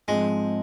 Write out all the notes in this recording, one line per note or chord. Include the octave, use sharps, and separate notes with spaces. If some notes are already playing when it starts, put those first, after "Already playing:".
G#2 F3 G#3 C4